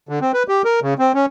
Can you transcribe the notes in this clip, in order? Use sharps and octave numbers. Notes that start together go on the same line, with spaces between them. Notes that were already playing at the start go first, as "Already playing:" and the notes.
D3
C4
B4
G4
A#4
C#3
C4
C#4